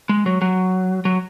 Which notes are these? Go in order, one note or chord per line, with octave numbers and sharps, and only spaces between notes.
G#3
F#3
F#3
F#3